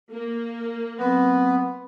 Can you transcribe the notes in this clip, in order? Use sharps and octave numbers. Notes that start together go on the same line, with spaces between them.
A#3
F#3 B3 C4 B4